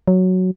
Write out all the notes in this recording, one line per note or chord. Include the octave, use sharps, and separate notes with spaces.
F#3